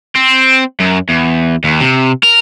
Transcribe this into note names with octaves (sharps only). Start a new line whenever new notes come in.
C4
F#2
E2
D#2
C3
A#4